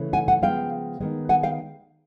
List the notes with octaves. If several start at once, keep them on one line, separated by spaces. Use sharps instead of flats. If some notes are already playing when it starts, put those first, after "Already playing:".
Already playing: C#3 E3 A3
F#5 G#5
F#5 G#5
C#3 F3 G#3 B3 F5 G5
D#3 G#3 B3
F#5 G#5
F5 G5